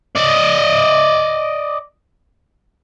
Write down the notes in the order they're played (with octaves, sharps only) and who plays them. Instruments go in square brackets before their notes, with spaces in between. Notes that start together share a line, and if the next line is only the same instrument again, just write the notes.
[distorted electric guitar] D5 D#5